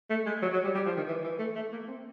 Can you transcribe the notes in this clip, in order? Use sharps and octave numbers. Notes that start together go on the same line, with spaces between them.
A3
G#3
F#3
F#3
G3
G3
F3
D#3
E3
E3
A3
A3
A#3
C4